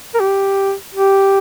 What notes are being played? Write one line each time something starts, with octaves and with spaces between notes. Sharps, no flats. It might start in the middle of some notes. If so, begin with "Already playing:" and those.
A#4
G4
G4